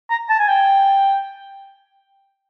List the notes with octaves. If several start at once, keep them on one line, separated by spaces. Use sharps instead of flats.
A#5
A5
G#5
G5